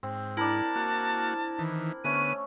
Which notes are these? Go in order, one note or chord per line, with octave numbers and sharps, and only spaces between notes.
G#2 C4
D4 E4 A#4 A5
A#3 F#4
D#3 E3
D3 A3 B3 C#4 D#7